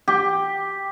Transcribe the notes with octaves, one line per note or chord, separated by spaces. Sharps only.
G4